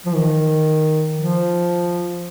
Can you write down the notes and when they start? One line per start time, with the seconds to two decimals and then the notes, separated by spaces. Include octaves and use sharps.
0.06 F3
0.15 D#3
1.16 F3